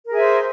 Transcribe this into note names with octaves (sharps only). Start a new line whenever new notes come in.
G#4 A#4 C5 E5